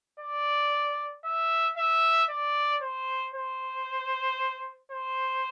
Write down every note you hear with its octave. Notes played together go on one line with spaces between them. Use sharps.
D5
E5
E5
D5
C5
C5
C5